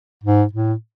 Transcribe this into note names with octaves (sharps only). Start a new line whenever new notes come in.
G#2
A2